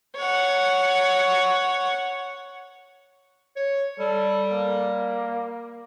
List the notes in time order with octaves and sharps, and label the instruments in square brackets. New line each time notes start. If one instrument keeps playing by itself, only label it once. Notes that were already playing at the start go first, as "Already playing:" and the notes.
[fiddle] C#5 F#5
[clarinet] C#5
[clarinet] G3 [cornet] A4
[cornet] A#3